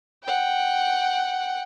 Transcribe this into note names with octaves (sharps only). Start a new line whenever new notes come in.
F#5 G5